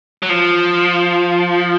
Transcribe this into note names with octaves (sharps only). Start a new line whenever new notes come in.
F#3
F3